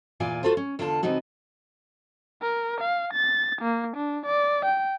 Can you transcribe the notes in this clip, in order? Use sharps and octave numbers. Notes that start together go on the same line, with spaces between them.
E2 A#2 E3 F4 D5 G#5
F4 F#4 A4 B4 C5
C#4
E2 D3 F4 A4 D5 A5
C3 E3 B3 D#4 F#4
A#4
F5
A6
A#3
D4
D5
G5